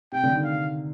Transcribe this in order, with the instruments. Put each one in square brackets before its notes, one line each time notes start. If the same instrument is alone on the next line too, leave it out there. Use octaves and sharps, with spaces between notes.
[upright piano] C3 [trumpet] G5
[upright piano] D3
D#3
[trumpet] F5